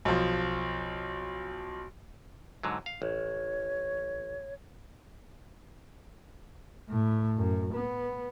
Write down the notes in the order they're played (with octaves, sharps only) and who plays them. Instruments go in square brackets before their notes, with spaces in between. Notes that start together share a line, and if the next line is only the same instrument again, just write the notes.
[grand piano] B1 F3
[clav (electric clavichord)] G#2 D3 F#3
F5
[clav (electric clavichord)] A1 [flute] C#5
[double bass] A2
F#2
B3